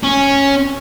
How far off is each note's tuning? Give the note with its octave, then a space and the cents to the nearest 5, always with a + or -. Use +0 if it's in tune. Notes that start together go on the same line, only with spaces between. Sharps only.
C#4 -5